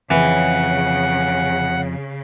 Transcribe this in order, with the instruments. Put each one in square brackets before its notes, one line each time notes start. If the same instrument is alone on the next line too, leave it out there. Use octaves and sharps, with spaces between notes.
[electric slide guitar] F2 [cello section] C#3 [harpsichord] E3 [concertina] F#5